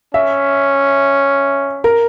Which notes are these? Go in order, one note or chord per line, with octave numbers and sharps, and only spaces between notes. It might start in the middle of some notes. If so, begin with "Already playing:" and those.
C#4 E5
A#4